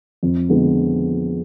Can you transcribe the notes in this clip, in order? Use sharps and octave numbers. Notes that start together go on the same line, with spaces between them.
F2
D3 F3 G#3 B3